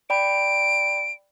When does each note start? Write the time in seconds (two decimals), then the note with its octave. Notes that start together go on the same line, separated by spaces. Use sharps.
0.10 D5 G5 B5 D7